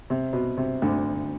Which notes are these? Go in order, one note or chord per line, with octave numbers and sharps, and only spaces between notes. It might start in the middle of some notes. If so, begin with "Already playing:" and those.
C3
B2
C3
D2 D3